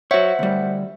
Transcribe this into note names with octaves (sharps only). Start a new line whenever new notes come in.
F#4 C5 C#5 E5 F#5
D2 G3